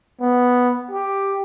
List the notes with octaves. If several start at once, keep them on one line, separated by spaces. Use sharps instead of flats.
B3
G4